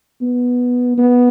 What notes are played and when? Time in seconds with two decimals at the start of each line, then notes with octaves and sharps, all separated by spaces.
0.22 B3
0.98 B3